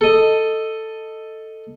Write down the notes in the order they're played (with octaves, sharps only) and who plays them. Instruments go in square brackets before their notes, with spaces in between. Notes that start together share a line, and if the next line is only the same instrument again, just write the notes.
[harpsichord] A4 D#5